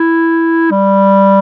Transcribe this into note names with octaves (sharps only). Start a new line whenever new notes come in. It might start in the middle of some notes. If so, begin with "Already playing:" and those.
Already playing: E4
G3